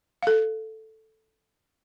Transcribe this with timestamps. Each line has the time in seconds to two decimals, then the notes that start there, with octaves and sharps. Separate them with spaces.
0.23 A4 F5